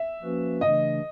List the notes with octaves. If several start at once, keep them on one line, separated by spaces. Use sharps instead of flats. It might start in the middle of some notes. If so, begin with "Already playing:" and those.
Already playing: E5
F3 A#3 C#4 F#4 B4
C#3 E3 A3 D4 D#5